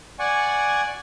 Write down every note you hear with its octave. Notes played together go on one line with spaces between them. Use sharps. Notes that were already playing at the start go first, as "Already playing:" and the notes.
D5 F#5 G#5 C#6